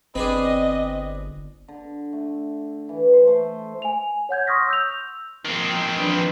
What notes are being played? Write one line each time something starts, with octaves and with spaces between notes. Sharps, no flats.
G1 C4 D4 G#4 B4 D#5
D3
A3
E3
C5
A3
G#5 F7
C#5 F#5 G6 G#6
C6 C#6 D#6 F6 A#6 B6
E6 G6 F7
A#2 D#3 F3 C4
F3 D4 B4